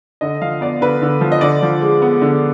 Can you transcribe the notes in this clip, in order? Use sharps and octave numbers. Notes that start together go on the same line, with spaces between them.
D3 D#5
F3 F5
B3 D5
D3 B4
D3
F3
D#5
D3 D5
F3
G#3
B3
D3